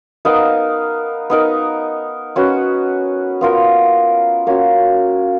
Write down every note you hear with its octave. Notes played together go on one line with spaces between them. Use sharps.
B3 D#4 A#4 F5
B3 D#4 A#4
C#4 F#4 B4
B3 F4 A#4
A#3 C#4 F#4